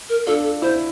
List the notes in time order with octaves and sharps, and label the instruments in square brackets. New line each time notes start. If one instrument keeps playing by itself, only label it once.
[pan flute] A#4
[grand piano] D4 F4 [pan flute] A4
[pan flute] A4
[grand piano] E4 [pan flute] C5